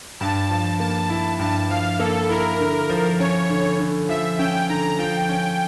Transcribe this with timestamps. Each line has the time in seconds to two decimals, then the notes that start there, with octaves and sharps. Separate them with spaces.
0.20 G2 A5
0.50 F3
0.80 A#3 A5
1.10 E4
1.39 G2 A5
1.70 F3 F5
1.99 A#3 A4
2.29 E4 A#4
2.60 D3
2.89 F3
3.20 C#4 C#5
3.50 D3
3.79 D3
4.09 F3 E5
4.39 C#4 G5
4.69 D3 A#5
4.99 F3 G5
5.29 C#4